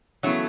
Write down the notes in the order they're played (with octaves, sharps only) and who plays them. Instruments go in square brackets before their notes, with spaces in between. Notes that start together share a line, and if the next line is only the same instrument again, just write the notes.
[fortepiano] C#3 E3 B3 E4 [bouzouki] F#3 A3